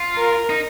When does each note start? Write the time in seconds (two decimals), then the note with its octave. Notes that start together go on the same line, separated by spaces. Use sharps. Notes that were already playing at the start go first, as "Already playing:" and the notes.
Already playing: F4
0.17 A#4
0.50 D#4